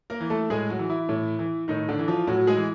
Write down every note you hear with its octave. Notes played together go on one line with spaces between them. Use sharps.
A#3 A#4
E3
A3 A4
A2 G#3 G#4
F#3 F#4
E3
E3 E4
A2
E3
A2 D#3 D#4
D3 D4
E3
F3 F4
A2 F#3 F#4
G#3 G#4
E3